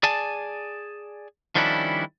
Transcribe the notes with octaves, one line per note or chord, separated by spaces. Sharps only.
G#4 D5 G#5 A5
D#3 F3 G3 C#4 D4 E4